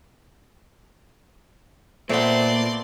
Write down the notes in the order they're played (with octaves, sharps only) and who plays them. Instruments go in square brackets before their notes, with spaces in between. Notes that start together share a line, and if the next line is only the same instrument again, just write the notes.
[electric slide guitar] A#2 [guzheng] A3 B3 [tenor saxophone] C4 [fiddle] D5 C6